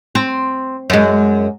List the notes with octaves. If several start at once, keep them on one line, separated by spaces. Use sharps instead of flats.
C4
F#2 G#3